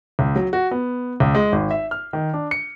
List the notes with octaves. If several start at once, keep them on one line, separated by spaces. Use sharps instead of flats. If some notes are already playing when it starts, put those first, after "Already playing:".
C#2
F#3
F#4
B3
C#2
G#3
G#1
E5
F6
D#3
D4
C#7